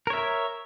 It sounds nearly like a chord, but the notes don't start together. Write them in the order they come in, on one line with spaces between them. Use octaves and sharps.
A#4 C#5 E5